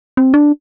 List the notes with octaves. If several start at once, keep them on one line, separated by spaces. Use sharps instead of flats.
C4
D4